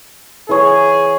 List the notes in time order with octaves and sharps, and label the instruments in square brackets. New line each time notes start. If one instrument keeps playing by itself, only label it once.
[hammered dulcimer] E3 C#5 [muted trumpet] G#4